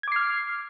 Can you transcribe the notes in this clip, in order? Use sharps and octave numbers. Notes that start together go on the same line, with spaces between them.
D6 F6 G#6 C7